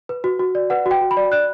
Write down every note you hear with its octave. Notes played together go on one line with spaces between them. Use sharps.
B4
F#4
F#4
D5
B4 F#5
F#4
G5
F#4
B5
D5
D5 F#6